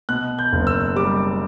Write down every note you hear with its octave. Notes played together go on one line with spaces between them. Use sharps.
B2 F#6
G6
F#1
E6
G3 D6